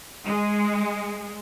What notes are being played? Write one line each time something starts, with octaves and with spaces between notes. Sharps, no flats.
G#3